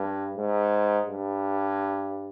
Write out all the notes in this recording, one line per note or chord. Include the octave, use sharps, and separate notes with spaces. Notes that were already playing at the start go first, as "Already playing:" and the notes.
Already playing: G2
G#2
G2